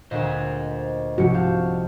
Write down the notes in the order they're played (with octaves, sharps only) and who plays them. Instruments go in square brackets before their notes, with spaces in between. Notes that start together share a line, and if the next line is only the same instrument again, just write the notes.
[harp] D2 A#2 [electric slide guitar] C5 D#5
[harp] C2 G#2 C#7 [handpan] C3 F3 F#4
[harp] F5 A5 G6